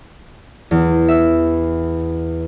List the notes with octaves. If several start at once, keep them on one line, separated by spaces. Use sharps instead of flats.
E2
E5